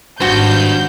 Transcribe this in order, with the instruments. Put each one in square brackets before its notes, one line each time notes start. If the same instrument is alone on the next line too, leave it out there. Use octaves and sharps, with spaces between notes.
[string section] G#1 G6 [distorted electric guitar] G2 [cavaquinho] F#4 C5